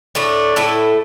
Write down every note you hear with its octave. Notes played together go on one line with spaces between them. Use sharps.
A2 A3 D4
A2 A3 E4 A4